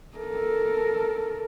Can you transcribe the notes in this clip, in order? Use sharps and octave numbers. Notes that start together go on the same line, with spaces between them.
A4 A#4